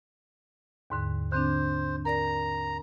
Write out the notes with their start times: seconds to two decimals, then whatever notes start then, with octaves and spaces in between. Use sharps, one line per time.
0.90 D#2 G#2 D3
1.32 D3 C4 D4 C5
2.05 A#4 D5 A#5 A#6